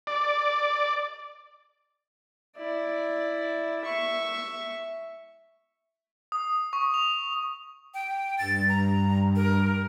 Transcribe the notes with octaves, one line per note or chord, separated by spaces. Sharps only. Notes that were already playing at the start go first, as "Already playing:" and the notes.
D5
E4 D5
E5 C#6
D#6
C#6
F7
G5
G2 A6
A#5
A#4